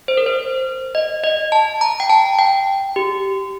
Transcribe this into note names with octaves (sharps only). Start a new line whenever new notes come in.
C5
A#4
C5
D#5
D#5
A5
A#5
G5
A5
G5
G4